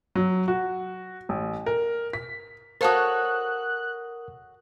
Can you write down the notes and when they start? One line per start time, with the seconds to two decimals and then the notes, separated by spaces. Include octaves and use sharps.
0.15 F#3
0.48 F#4
1.29 A1
1.66 A#4
2.13 B6
2.81 F#4 A4 A#4 C5 C#5 F5 D#6 F#6